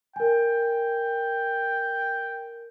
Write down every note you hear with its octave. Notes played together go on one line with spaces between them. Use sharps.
A#4 G5 G#5